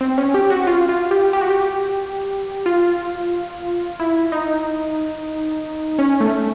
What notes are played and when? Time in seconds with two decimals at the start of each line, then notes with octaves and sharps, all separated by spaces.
0.01 C4
0.18 C#4
0.34 G4
0.50 F#4
0.67 F4
0.89 F4
1.11 G4
1.33 G4
1.41 F#4
1.51 G4
2.66 F4
4.00 E4
4.32 D#4
5.99 C#4
6.20 A3